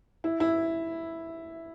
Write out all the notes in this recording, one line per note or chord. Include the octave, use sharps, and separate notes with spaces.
E4
E4